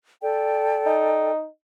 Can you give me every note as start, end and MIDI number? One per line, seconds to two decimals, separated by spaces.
0.21 1.31 69
0.21 1.31 74
0.21 1.31 79
0.86 1.45 63